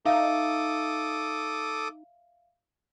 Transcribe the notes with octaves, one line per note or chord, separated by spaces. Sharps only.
D#4 A4 E5 F5 D6 D#6